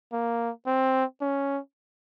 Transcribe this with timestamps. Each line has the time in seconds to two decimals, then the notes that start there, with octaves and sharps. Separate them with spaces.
0.13 A#3
0.66 C4
1.21 C#4